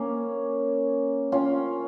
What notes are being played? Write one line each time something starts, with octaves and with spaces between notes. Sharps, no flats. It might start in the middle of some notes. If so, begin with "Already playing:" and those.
Already playing: A#3 C#4
C#4 F4